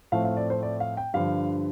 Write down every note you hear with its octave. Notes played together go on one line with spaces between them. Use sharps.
A2 F3 A3 C4 F5
F5
D5
C5
D5
F5
G5
G2 D3 F3 F5